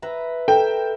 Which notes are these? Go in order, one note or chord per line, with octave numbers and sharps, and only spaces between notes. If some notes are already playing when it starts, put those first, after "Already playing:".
B4 E5 A#5
A4 A#4 G5